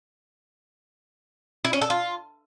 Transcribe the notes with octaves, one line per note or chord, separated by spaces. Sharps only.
E4
C#4
A4
F4